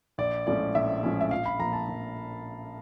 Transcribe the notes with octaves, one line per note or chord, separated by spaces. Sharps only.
A#1 D5
A2 F3 G#3 C#4 D5
A#1 E5
A2 F3 G#3 C#4
E5
A#1 F5
B5
A#2 F3 A#5
A5
A#1